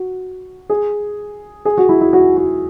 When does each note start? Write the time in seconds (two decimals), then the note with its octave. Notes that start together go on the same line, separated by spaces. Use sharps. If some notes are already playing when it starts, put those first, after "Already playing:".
Already playing: F#4
0.70 G#4
1.65 G#4
1.78 F#4
1.89 E4
2.01 E4
2.13 F#4
2.37 F#4